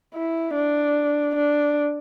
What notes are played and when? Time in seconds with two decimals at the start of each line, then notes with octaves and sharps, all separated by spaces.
0.15 E4
0.55 D4
1.36 D4